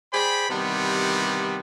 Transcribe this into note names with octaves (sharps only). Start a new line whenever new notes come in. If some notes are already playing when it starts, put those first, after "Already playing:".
G#4 C5 D5 G5 B5
C3 D#3 E3 G3 B3